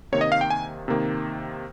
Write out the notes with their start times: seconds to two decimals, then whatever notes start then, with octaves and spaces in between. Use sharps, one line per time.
0.12 C3 D#3 A#3 C#5
0.21 D#5
0.32 F5
0.41 G5
0.50 G#5
0.88 C3 D#3 A#3